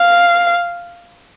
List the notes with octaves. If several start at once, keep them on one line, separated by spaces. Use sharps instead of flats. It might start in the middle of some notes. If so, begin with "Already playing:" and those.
Already playing: F5